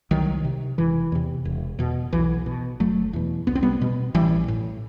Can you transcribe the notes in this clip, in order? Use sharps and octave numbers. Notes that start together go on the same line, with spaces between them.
C2 D#3 F#3
C3
E1 E3
E2 C3
E1
E2 B2
B1 E3
B2
F#1 F#3 A3
E2 B2
C2 B3
C4
G3 B3
B2
A1 E3 G3
A2